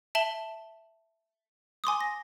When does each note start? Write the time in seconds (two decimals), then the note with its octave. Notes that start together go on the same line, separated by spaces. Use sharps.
0.15 E5 A5 F#7 G7
1.84 G#5 C6 D6 D#6
2.01 A#6